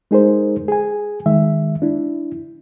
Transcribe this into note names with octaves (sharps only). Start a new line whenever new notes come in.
G#3 D#4 G#4 A#4 C5
G#4 G#5
D#3 G#3 E5
D4 E4